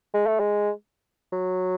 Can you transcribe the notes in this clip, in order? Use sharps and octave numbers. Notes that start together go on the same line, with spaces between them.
G#3
A3
G#3
F#3